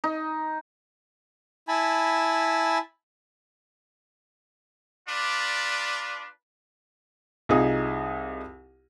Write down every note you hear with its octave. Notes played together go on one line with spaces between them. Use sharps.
D#4
E4 G#5 A5 B5
D4 F4 B4 D5
C2 D#4 F4 G#4 D#6